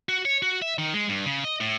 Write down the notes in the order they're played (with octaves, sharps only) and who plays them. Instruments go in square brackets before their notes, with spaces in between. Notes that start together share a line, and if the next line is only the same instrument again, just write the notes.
[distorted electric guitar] F#4
C#5
F#4
E5
D#3
G#3
G2
C#3
D#5
A2